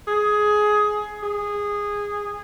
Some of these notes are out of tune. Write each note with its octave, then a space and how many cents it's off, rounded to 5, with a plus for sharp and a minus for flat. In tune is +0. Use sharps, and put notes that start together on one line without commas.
G#4 +15
G#4 -15